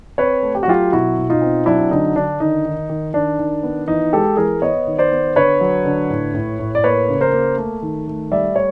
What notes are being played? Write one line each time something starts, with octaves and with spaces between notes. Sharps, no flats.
C4 B4 C#5
A3
G4
F#4
F#3 F4 G4
B2 E4 F#4
B2
D#4 F4
C4
F#3 D4 E4
D3 D#4
D3 D4
D#3 D#4
D#3
D#3
D#3 D4
D#3
B3
E3 D#4
G#3 G4 A4
E3 G#4 A#4
B3 C#5 D#5
D#3
C5 D5
B3
D3 B4 C#5
F#3
D3
A2
A2
A2
D5
A#3 B4 C#5
C#3
A#4 C5
A#3
A3
D#3
A3
G3 D5 E5
C#5